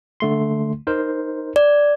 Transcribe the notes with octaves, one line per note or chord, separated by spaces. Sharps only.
D3 A3 C6
D#4 A#4 C5
D5